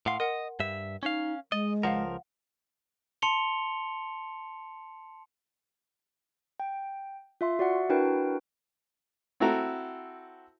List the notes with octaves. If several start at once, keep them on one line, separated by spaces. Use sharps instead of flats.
A2 F5 F#5 C6
A#4 D#5 F#5
G2 E5
C#4 D#4 F5
G#3 D#5 A6
C#2 F3 A#4 F5 F#5
A5 C6 C#7 F7 G7
G5
F4 E5 C6
F#4 D5 E5 F#5
D4 E4 F#4 A#4 B4 G5
C4 E4 F#4 A4 A#5